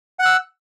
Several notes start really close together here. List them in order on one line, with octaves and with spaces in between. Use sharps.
F#5 F#6 E6